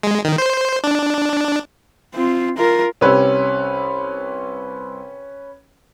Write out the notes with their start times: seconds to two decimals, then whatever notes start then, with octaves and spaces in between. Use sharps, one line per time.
0.03 G#3
0.25 D#3
0.38 C5
0.84 D4
2.14 C4 F4
2.57 F4 A#4
3.01 C2 C#4 G4 B4 C#5 E6